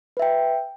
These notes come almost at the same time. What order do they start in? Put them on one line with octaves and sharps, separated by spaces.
B4 E5 G5